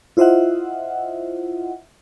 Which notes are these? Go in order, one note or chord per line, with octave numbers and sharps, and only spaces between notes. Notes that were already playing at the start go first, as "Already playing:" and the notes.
E4 F4 C5 D#5 E5 F#5